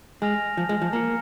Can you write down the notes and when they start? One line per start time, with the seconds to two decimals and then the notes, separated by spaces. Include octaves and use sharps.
0.22 G#3 G#5 F6 A#6 F7
0.57 F3
0.69 G#3
0.82 F3
0.93 A#3 A#5 F6 C#7